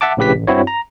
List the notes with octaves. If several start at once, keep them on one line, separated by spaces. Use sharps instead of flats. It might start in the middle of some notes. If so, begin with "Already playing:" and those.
E5 F#5 A5 D6
A#1 A2 C#3 G4 B4 B6
A1
G2 C4 E4 F#4 C#5
A#5